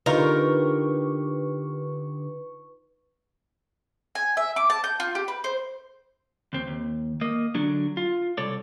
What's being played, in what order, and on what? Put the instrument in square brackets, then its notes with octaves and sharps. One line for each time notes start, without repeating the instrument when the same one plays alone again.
[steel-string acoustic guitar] D3 G4 [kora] D#4 F4 [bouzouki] A#4 [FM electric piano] B4 C#6
[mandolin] G#5
E5
D6
A5
G6
F4
G4
B4
C5
[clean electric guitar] D#2 C4
D#2
A#3 D#5
D3 F#3 D4
F4
C2 A4 C#5 D5